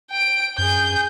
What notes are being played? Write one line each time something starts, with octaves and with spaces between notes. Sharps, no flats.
G5 D7
F#2 G#4 G6